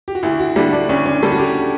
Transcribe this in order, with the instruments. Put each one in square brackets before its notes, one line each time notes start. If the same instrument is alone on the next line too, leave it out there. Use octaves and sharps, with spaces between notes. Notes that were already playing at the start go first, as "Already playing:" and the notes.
[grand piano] G4
F#4
[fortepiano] D2 [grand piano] E4
[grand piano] F#4
[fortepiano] D3 G3 [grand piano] E4
[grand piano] D4
[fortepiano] D2 [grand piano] C#4
[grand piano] C#4
[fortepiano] D3 G3 [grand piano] A4
[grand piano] F#4
G4